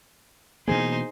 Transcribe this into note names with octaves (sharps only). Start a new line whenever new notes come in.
B2 E3 A#3 D#4 G#4 C5